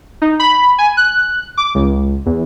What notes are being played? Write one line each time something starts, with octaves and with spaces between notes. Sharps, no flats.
D#4
B5
G#5
F#6
D6
C#2
E2